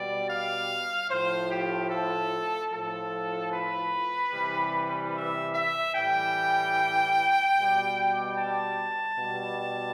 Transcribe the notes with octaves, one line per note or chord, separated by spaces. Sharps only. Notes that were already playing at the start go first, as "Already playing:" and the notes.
Already playing: B2 G3 D5
F5
A2 F3 C5
G4
A4
A2 F3 A4
B4
C3 E3 G3
E5
E5
A2 E3 G3 G5
B2 G3
A5
B2 G3